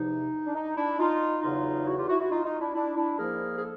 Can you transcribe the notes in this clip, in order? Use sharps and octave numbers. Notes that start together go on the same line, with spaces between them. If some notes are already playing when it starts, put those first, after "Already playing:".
Already playing: E2 C3 F3 D#4
D4
D#4
D4 E4
D#4 F4
E2 C#3 F#3 D#4 F4
E4 F#4
F4 G4
E4 F#4
E4 F#4
D#4 F4
D#4 F4
D4 E4
D4 E4
D4 E4
G#2 F3 A#3 G#4 A#4
G#4
A4